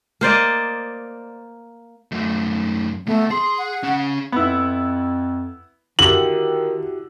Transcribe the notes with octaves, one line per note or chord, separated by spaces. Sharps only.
A#3 C5 D5 D#5
F#2 A3
D2 A3 B3
G#4 C6
F#5
C#4 G#4
F2 B3 E4
D3 D#3 E4 F#4 G4 F#7